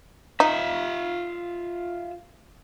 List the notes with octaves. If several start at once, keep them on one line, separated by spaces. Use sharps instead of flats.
D#4 F4 E5